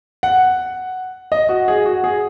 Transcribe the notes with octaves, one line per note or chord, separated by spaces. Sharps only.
F#5
D#5
F#4
G#4
F#4
G#4